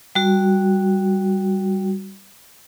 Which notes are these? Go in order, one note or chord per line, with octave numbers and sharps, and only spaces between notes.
G3 F#4